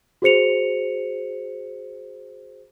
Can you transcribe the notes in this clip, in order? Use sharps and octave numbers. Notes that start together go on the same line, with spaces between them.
F#4 G#4 C5 C#7 F7